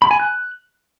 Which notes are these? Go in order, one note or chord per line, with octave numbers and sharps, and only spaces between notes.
B5
G#5
F#6